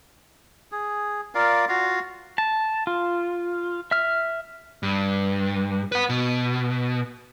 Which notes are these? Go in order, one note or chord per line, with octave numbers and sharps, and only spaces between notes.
G#4
F4 A#4 D5 F5
F4 F#4 F5
A5
F4
E5 F6
G2
B4 F#5
B2